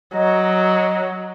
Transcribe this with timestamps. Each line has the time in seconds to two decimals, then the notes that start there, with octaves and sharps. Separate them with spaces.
0.15 F#3 D#5 A#5